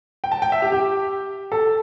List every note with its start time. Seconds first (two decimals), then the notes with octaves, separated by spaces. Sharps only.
0.24 G5
0.32 A5
0.42 G5
0.52 E5
0.62 G4
0.72 G4
1.52 A4